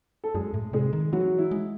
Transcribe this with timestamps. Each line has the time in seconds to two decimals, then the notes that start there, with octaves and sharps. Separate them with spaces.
0.24 A4
0.34 F#2 G#3 G#4
0.54 A2
0.73 C3 G#3 G#4
0.93 D#3
1.13 E3 F#3 F#4
1.38 E4
1.51 G#3